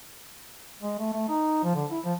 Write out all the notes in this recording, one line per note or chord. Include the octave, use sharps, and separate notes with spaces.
G#3
A3
A3
D#4
F3
D3
E4
F3